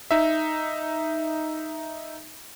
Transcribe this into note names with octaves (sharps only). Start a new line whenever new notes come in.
D#4 E5